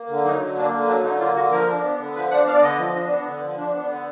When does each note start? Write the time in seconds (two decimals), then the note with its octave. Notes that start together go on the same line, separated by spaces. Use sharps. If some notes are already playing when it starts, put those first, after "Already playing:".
Already playing: A#3
0.09 D3
0.25 F#3 D#4
0.41 D3
0.57 A#3 D4
0.72 D3
0.88 F#3 D4
1.04 D3 D#4
1.20 A#3 F4
1.35 D3 F#4
1.51 F3 A#4
1.68 D4
1.83 B3
2.00 D3
2.15 F3 B4
2.31 D4 F#5
2.47 B3 F5
2.54 D5
2.62 D3 D#5
2.78 F3
2.94 D4
3.10 B3
3.26 D3
3.42 F3
3.57 D4
3.74 B3
3.89 D3